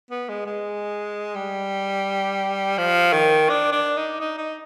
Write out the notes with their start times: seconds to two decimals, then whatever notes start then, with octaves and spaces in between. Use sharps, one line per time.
0.11 B3
0.29 G#3
0.46 G#3
1.35 G3
2.78 F3
3.13 D#3
3.49 D4
3.72 D4
3.97 D#4
4.20 D#4
4.38 D#4